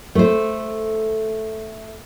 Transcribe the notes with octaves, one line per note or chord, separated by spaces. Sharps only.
A3 C5